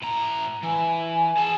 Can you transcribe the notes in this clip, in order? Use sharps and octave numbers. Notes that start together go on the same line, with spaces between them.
A2 A#5
E3 G#5
G#4 A5